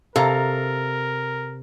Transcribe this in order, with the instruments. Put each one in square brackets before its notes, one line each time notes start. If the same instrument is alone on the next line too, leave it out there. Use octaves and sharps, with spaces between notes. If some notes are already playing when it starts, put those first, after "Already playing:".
[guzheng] C3 [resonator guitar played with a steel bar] A4 F5 A#5 [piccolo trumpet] A#4